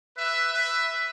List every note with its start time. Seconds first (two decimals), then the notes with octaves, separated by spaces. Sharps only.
0.17 B4 E5
0.53 B4 E5